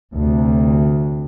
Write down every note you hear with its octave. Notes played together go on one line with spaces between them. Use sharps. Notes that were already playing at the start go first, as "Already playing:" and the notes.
D2 C3